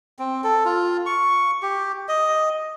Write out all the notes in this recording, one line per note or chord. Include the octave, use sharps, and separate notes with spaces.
C4
A4
F4
C#6
G4
D#5